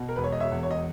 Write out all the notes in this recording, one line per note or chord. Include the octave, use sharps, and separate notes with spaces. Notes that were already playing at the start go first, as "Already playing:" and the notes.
Already playing: B2
A#4
E1 B4
C#5
D#5
C#5 E5
E2
C#5
D#5